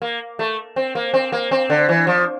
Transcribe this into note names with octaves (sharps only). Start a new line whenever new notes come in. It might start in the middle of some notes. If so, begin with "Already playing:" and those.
A#3
A3
C4
A#3
C4
A#3
C4
D3
E3
F3